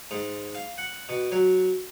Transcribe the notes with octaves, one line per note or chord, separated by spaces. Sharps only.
G#2
F5
F#5
B2
F#3